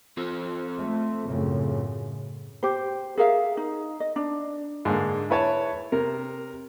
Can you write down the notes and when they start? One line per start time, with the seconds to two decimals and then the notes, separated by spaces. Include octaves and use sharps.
0.17 C4 F4 A4
0.77 A3
1.27 F#2 A2 C#3
2.63 G4 C5
3.18 G#4 A#4 E5 F5
3.57 D#4
4.00 D#5
4.16 D4
4.85 G#2 D3 A#3
5.30 E4 B4 C#5 A5
5.92 C3 A#4